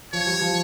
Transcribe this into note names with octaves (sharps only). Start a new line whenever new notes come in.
F3 C#5
G3
F3